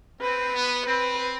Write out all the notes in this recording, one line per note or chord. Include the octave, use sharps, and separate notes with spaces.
C4 B4
B3
C4 B4